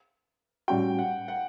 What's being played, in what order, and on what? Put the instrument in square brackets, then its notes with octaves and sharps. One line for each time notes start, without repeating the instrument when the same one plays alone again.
[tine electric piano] A2 G3 C#4 F#4 [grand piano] G5
[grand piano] F#5
F#5